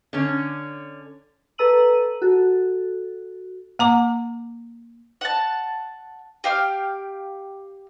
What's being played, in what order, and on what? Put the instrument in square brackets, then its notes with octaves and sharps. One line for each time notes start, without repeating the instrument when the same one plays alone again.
[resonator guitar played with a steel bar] D3 C#4
[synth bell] A4 B4 A#5 E6 D#7 F#7
F#4 A4
[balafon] A#3 A#5 D6
[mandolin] F#5 A5
G4 F5 G5 F6